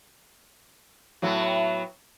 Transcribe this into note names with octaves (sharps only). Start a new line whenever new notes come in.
A2 F#3 B3